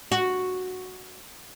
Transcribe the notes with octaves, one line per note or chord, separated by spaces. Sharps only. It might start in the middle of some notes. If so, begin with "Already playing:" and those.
F#4